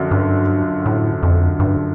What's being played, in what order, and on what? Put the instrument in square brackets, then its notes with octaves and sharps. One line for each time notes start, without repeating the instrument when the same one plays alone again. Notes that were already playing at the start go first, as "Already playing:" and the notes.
Already playing: [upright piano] F#2 D3 F3
[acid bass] G2
A2
F2
G2